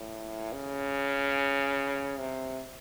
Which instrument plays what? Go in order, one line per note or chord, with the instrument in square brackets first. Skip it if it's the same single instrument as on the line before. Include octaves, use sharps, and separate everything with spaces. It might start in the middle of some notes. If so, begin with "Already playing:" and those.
Already playing: [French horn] A2
C#3
C3